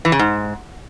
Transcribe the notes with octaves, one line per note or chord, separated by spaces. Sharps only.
E3
C#3
G#2